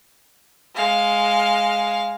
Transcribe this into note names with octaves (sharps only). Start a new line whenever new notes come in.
G#3 F5